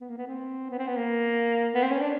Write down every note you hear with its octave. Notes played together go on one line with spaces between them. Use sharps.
B3
A#3
B3
C4
B3
C4
B3
A#3
B3
C4
C#4
D4